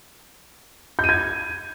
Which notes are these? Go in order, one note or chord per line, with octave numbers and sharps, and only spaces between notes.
G6
D#7
G#6